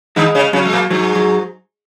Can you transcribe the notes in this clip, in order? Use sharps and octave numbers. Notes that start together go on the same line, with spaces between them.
D#3 G#3 D#4
C#3 C#4
C#3 F#3 C#4
G#3
A#2 A#3
G#2 F#3 G#3
F#3